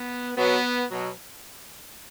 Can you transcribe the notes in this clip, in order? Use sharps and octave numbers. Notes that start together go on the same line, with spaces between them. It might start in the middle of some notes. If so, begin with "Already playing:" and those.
Already playing: B3
B2 F#3 B3
B2 F#3